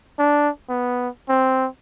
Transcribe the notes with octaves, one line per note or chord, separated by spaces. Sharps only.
D4
B3
C4